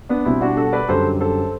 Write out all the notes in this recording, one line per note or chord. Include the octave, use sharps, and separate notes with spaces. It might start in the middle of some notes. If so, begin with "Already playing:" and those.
B3 D4
B2 G3 C4 E4
D4 F#4
F#4 A4
B4 D5
F#2 D3 G3 A4 C5
A4 C5